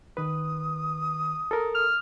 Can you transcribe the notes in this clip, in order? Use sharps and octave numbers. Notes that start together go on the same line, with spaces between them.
D#3 B4 D#6
A4 A#4
F6